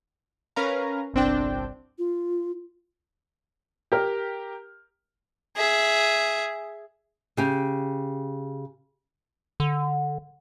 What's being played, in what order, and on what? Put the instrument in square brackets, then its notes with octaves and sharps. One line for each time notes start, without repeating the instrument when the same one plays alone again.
[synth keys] C#4 A#4 B4 F5 A#5
G1 C2 C4 D4 G5
[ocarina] F4
[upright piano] G4 A#4 F6
[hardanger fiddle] G#4 E5
[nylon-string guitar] C#3 G4 G#5
[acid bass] D3